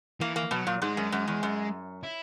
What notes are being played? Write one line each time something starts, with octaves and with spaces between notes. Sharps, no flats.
E3 A#3
A#3
B2 F#3
A#2
G#2 G#3
F#2
F#2
E2
F#2
E4